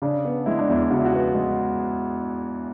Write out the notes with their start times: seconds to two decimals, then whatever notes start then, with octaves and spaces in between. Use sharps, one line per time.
0.02 C#3 D4
0.25 B3
0.46 G#3 E4
0.59 D4
0.69 E2 E4
0.90 C#3 F#4
0.99 E4
1.05 F#4
1.13 B3
1.35 G#3